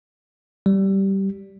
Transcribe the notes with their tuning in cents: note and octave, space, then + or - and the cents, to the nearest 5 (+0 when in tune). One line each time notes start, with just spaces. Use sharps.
G3 -15